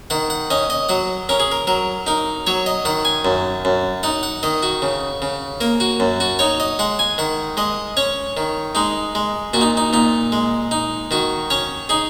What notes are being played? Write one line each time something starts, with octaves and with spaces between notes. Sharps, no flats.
D#3 F#5
F#5
C#4 D#5
D#5
F#3 F#5
C#4 A#4
G#4
A#4
F#3 A#4
D#4 A#4
F#3 C#5
D#5
D#3 F#5
G#5
F#2
F#2
D#4 F#5
F#5
D#3 D#5
F#4
C#3
C#3
A#3 A#4
F#4
F#2
F#4
D#4 C#5
D#5
G#3 F#5
G#5
D#3 F#5
G#3 D#5
C#4 C#5
D#3
G#3 D#4
G#3
A#2 F#4
D#4
D#4
A#2 D#4
G#3
D#4
D#3 F#4
C#4 C#5
D#4 G#4